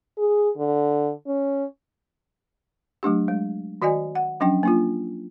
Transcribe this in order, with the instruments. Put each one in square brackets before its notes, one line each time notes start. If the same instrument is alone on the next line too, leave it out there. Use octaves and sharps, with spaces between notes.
[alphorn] G#4
D3
C#4
[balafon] F#3 A3 D4 G4
G#3
D#3 F#4 D5 D#5 G#5
F#5
F3 F#3 C#4 D4 G5
A#3 D4 F4